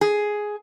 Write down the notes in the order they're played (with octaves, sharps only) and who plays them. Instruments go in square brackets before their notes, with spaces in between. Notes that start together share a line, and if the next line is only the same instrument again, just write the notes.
[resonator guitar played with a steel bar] G#4